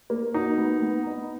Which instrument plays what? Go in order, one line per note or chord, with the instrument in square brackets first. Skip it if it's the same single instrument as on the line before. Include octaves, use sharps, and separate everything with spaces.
[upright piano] A#3
[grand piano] D#4 [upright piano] F#4
[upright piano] B3
B3
D#4